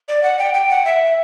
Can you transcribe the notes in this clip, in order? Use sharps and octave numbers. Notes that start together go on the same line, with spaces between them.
D5
F#5
G5
G5
F#5
E5